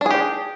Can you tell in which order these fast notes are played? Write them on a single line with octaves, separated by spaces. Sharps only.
D4 G#4 G4